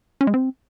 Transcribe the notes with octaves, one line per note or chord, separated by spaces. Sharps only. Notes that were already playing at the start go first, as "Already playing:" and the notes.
C#4
G#3
C4